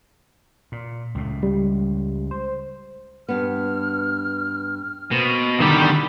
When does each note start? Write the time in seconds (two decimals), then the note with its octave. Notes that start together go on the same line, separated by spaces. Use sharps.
0.72 A#2
1.15 C#2 A2
1.43 G3
2.31 C5
3.29 G2 B3 F6
5.11 B2 A#3 C4
5.60 E2 D3 D#3 G3 G4 B5